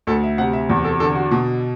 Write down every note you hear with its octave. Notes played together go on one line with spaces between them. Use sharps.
D2 A4
E5
C3 F#5
E5
E2
A4
D3 A4
F#4
B2